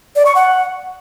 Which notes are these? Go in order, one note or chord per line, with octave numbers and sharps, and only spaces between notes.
D5
C#6
F#5